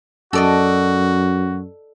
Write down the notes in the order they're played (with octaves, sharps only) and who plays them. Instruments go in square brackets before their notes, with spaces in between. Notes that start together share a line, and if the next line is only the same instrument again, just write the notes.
[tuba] F#2 [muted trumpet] F#4 [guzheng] A4 D5 D#5